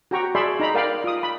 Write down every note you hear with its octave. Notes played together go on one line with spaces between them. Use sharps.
F#4 G4 G5 A#5 C#6
G#4 D5 E5 B5 C6
D#4 A#5 B5
A#4 D5 F5 G5 B5
F4 D#6
B5